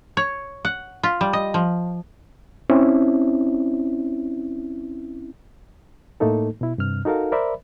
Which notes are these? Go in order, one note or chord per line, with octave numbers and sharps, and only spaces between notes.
C#5
F#5
F4
G3
D#5
F3
C4 C#4 E4
A2 A3 A#3 D#4 A4
B2 E4
G2 C3 F6
D#4 F#4 A4 A#4 F5
A#4 C5 D5 E5 B5